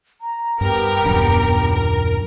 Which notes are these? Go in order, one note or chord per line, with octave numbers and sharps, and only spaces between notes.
A#5
G2 B3 G4 A#4
D#1 F#2 D4
A#4